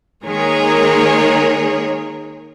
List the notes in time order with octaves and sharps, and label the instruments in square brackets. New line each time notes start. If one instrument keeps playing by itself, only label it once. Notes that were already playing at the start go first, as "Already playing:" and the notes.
[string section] D#3 G#3 A#3 G#4 A#4 C#5